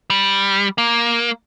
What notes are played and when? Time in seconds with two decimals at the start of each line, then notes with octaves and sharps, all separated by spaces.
0.10 G3
0.78 A#3